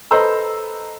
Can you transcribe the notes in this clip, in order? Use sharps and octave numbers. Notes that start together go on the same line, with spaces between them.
A4 B4 C5 D#5 A#5 E6